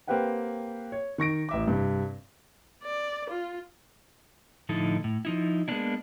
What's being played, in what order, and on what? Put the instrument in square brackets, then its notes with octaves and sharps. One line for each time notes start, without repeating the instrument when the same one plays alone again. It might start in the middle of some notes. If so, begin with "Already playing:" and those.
[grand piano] A#3 C4 G4 B4 F#5 G5
C#5
D#3 C#6 A#6 D7
A1 E5 D6
G2 C3
[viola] D5
F4
[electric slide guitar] A2 D3 F3 D#4 E4 A4
A2
F3 D#4 E4
G#3 A#3 B3 C#4 D4 E4